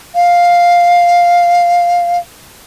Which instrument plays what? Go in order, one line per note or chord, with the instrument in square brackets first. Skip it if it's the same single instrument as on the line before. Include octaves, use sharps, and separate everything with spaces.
[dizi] F5